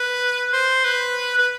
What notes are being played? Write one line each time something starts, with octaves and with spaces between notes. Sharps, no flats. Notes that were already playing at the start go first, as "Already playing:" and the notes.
Already playing: B4
C5
B4
B4